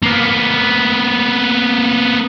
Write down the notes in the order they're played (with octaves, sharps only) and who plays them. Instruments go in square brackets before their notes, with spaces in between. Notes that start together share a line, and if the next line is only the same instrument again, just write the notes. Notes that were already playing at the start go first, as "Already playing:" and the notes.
[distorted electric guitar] A#3 B3